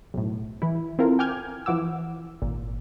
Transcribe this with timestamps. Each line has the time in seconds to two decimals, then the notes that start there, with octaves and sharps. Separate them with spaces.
0.14 B1 A2
0.62 E3 E4
0.99 C4 E4 F4 A4 A#4
1.19 G5 G#5 D6 F6 G6 G#6
1.66 E3 F3 F#5 D6 E6
2.42 G#1 A#2